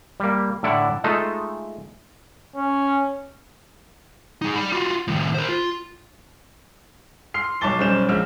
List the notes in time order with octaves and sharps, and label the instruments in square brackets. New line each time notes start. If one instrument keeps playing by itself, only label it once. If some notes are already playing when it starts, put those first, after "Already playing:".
[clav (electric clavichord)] G3 A#3
A2 D3 E4 D5 F#5
G#3 A3 D#4 F4 A4
[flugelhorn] C#4
[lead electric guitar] D#4 G#4
D5 B5
F4 F#4
A2 D#3
A#4 C5
F4
[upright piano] C6 F6 C7
B1 C#5 A5 D6 A6 G7
B1 G3 C#4 C5 G6 E7
A#1 G#3 F6